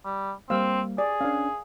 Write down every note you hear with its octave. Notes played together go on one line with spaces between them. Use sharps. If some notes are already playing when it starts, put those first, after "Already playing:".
G3
G3 A#3 C4 C5 F5 E6
G#4 D5
C#4 D4 F5 G#5